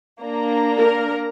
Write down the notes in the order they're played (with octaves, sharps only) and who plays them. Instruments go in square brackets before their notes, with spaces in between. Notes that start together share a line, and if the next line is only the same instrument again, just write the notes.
[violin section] A#3 D4 A#5
[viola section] A#4